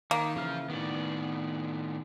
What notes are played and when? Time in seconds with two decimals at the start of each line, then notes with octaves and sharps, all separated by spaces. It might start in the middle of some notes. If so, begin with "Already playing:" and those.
0.11 D#3 A#3
0.36 C#3 E3 F3 F6
0.70 A2 D#3 B3 D5